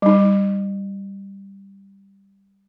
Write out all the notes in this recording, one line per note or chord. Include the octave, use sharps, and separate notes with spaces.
G3 D#4